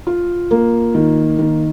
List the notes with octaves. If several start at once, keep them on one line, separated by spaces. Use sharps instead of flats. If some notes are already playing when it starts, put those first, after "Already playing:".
F4
A#3
D#3
D#3